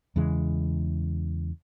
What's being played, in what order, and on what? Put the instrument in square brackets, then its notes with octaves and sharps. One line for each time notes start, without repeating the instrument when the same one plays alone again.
[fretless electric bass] E2 C#3 E3 G#3